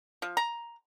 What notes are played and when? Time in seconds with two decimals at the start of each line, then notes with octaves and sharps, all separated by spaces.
0.22 F3
0.37 A#5